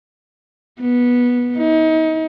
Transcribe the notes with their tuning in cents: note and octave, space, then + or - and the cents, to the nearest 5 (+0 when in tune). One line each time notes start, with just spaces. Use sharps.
B3 -15
D#4 +35